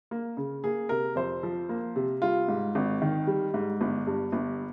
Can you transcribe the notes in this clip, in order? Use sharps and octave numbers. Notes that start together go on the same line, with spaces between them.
A#3
C#3
A#3 G#4
C3 A#4
F2 C5
F3
A#3
C3
G3 F4
G#2
G#1
D#3
G3
G#2
G1
G2
G1